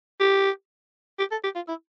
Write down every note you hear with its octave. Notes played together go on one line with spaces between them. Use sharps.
G4
G4
A4
G4
F4
E4